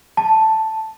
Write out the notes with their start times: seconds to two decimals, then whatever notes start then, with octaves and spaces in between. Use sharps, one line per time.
0.17 A5